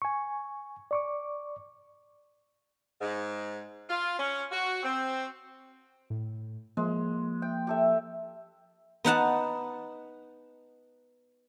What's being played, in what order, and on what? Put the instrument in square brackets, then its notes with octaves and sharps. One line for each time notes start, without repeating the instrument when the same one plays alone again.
[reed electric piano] G#5 C#6
D5 C#6 D6
[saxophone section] G#2
F4
C#4
F#4
C4
[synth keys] A2
[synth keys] F3 A#3 [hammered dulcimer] G#3
[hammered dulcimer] G5
G4 A4 E5
[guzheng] B3 D#4 F#5 A5